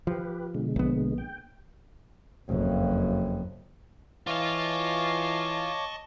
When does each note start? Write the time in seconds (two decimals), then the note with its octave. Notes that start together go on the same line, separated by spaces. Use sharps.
0.07 F3 G4 B4
0.55 B2 D3 G#3
0.76 A#1 B3
1.18 G5
2.49 F#1 F2
4.27 E3 F4 C#5 D#5 F5 A5 C#6 D6